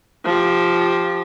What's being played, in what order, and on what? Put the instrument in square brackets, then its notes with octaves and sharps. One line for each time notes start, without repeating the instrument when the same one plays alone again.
[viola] F3 G4